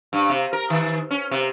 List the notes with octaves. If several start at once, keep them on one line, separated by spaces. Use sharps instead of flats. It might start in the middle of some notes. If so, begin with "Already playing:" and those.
G2
C3
A#4
D#3
C#4
C3